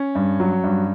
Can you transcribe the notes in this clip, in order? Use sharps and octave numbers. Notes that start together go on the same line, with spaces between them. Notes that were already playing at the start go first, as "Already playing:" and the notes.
Already playing: C#4
G2
F#3
G2